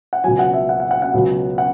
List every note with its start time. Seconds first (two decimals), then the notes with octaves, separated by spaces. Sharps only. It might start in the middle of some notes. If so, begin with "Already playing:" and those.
0.13 F#5
0.24 C#2 B2 F#3 G#5
0.39 F#5
0.54 E5
0.69 F#5
0.80 F#5
0.91 F#5
1.02 F#5
1.14 C#2 B2 F#3
1.58 F#5